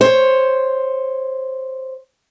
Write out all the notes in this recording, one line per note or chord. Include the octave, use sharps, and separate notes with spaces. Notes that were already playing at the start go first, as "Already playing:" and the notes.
C5 C#5